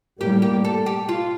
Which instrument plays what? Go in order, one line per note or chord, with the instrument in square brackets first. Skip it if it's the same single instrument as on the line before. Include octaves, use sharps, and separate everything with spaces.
[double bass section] A2 G3 A#3 [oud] G4
[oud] G4
A4
G4
F4